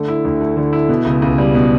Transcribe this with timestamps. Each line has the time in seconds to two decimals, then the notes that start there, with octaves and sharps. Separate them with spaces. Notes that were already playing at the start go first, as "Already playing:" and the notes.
Already playing: D3 A3
0.08 E4
0.25 D2
0.41 A3
0.57 D3
0.73 E4
0.89 B2
1.05 C#2
1.22 C#2
1.38 G3
1.55 B2